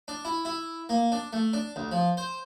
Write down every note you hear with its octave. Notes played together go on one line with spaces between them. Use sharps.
D4
E4
E4
A#3
D4
A3
D4
D2
F3
C5